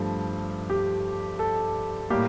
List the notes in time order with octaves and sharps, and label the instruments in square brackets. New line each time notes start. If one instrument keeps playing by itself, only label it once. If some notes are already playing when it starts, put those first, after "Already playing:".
Already playing: [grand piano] G2 F3 A3
G4
A4
A2 G3 A#3 G4